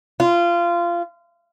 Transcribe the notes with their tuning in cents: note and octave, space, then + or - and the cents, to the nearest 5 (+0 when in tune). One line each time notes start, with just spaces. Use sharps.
F4 -20